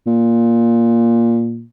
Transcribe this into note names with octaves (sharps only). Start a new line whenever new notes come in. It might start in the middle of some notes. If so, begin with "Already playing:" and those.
A#2